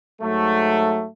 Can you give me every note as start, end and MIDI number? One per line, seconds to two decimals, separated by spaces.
0.22 1.06 44
0.22 1.06 54
0.22 1.06 57